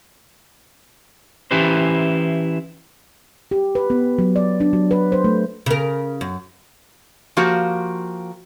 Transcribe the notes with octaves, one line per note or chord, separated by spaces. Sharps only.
E3 C#4 E4 G4 B4 C5
G4
B4
B3
F#3
D5
D4
F#3
B4
C5
A3
C#3 A#4
F#2
F3 A#3 F#4 G4